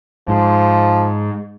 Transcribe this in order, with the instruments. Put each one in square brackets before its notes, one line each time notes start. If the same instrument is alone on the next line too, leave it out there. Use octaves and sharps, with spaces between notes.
[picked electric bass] G#2 [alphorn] F3